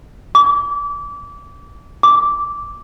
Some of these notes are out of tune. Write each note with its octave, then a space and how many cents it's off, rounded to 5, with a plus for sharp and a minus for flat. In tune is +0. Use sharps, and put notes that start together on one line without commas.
D6 -25
D6 -10